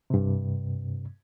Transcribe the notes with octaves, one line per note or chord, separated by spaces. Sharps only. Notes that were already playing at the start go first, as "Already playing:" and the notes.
G2 C3